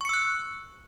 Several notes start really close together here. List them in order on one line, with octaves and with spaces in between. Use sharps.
C#6 C#7 E6 F#6